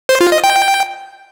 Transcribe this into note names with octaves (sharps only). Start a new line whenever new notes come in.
C5
F4
D#5
G5